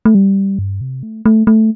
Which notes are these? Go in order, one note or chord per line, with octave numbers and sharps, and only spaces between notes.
A3
G3
G2
C3
A3
A3
A3